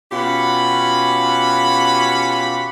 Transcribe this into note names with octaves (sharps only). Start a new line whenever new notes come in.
B2 C#4 F4 G4 F#5 B5